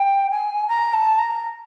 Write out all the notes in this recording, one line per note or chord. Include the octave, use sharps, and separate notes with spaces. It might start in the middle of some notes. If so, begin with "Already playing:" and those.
Already playing: G5
G#5
A#5
A5
A#5